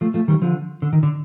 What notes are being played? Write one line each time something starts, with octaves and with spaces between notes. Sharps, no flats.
F3 A3
F3 A3
D#3 G3
D3 F3
D3
D#3
D3